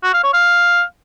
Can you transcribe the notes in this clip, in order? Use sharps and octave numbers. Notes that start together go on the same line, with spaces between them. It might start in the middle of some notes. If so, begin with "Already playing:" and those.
F#4
F5
C#5
F5